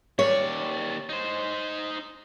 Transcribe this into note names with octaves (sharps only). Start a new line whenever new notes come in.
D#2 C#5 D5
D#4 C5